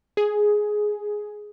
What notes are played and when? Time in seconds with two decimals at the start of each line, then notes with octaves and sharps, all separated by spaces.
0.17 G#4